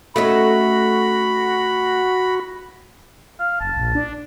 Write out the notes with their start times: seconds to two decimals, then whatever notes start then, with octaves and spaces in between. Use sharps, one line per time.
0.16 A3 C#4 D#4 F#4 B5
3.40 F5
3.61 F#1 A5
3.76 A#1
3.95 D4